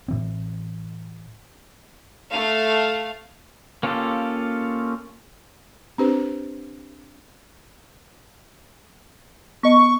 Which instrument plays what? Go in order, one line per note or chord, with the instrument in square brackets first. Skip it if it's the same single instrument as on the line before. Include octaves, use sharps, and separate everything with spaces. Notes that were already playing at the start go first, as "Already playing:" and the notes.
[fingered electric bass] A2 E3 C4
[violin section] A3 F5
[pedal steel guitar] A#3 C#4 F4 G4 A4
[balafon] C4 D4 G4 B4 C5
[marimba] B3 D#5 [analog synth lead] C#6